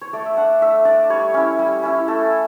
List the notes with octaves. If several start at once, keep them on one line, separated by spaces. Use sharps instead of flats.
C#5
A3 D5
E5
D4 F#5
A3 E5
D4 D5
G3 C#5
C#4 E4
G3
C#4 E4
A3 A4